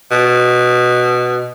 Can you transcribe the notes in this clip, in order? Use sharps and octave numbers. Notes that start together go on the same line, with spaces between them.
B2